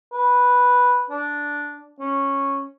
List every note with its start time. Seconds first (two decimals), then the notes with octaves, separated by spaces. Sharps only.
0.13 B4
1.10 D4
2.00 C#4